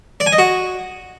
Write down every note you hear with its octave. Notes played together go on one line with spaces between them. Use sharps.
D5
G#5
D#5
F#4